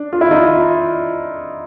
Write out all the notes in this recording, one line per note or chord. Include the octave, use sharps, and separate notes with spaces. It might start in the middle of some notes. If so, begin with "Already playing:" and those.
Already playing: D4
F4
E4
D#4 F4